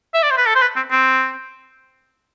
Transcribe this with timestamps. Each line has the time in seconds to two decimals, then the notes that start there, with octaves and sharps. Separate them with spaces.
0.14 E5
0.23 D5
0.31 C5
0.37 B4
0.47 A4
0.55 C5
0.62 B4
0.76 C4
0.91 C4